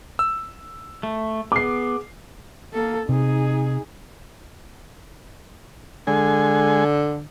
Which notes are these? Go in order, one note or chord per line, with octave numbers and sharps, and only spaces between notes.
E6
A3
B3 G#4 D6 C7
A#3 A4
C3 D#4 G#4
D3 G#3 G#5